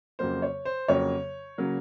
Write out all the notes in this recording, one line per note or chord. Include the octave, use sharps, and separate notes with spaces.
F2 C#3 F#3 A#3 C5
C#5
C5
F2 C#3 F#3 A#3 C#5
C#3 F#3 A#3